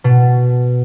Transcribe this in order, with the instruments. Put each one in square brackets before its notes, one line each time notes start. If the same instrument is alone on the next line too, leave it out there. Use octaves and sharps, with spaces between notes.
[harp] B2